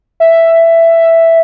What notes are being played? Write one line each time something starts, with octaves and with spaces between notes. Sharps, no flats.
E5